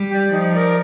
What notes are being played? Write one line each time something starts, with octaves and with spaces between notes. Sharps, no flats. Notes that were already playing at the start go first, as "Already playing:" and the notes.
Already playing: G3
G4 D5
F3 D#4
A#4 D5